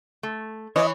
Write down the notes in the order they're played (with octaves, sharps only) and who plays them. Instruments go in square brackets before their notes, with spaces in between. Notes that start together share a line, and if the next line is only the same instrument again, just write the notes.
[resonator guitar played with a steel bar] A3
[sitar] E3 [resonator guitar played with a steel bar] C#5 [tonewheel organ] D#5